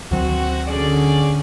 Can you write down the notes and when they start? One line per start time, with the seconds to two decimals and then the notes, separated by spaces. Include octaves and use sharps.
0.11 D2 D#3 F#3 C4 F#4
0.68 D3 C#4 G#4 D5